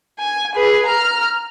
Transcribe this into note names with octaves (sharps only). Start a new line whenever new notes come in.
G#5
G#4 B4
A#5 F6